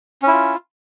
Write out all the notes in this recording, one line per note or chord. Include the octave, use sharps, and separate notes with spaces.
C#4 E4 F4